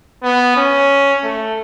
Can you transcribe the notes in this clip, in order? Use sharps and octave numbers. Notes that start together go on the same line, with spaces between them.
B3
C#4
A3